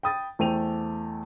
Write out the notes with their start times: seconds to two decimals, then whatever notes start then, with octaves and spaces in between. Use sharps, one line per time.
0.03 G5 B5 D#6 A6
0.39 E2 A3 C5 G5 D#7 F7